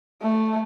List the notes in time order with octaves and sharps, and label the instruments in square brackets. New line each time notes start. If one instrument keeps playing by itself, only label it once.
[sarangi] A3